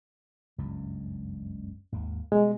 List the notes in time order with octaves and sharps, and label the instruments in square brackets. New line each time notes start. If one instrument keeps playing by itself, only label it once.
[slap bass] F#1 C#2 G2
G#1 D#2 A#3
[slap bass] B2 G3 [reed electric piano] G#3